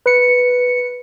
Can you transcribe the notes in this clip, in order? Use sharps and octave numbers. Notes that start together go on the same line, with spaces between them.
B4 C#7